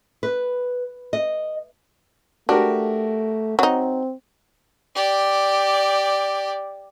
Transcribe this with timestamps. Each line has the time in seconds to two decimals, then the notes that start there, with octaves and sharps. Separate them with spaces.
0.23 B4
1.13 D#5
2.49 A3 D4 F#4 G4 A#4
3.59 F#3 C4 D#4
4.95 G4 D5